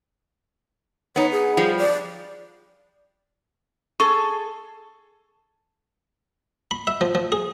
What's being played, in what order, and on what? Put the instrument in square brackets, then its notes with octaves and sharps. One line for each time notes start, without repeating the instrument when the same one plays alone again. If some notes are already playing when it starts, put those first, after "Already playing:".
[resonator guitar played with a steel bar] B3 D#4 [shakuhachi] C#5
[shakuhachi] G#4
[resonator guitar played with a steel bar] F3 G3
[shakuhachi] D5
[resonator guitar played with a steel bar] G#4 A4 A5 [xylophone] C#6
[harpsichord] B5
E5
F3
F3
G#4